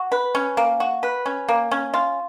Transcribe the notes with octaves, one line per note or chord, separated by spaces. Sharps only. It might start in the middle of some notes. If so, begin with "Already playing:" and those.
Already playing: F#4
B4
C#4
A#3
F#4
B4
C#4
A#3
C#4
F4